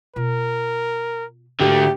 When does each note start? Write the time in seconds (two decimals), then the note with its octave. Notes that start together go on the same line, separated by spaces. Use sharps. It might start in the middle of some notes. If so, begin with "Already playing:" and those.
0.16 B2 F4 A#4
1.60 G#2 D3 A3 A#3 G4